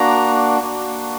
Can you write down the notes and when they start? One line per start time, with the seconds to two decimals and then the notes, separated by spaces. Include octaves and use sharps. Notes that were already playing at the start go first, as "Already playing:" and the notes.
Already playing: A#3 D4 F#4 A#5
0.62 A#3 D4 F#4